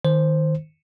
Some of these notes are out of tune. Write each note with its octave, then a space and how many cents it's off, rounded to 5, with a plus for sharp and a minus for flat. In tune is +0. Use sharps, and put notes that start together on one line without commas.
D#3 +0 C5 +0